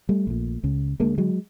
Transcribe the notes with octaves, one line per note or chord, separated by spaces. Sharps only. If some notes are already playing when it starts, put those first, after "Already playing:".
G3 A3
A#1 A#2
C#2 C#3
D2 D3 G#3 A#3
F#3 G#3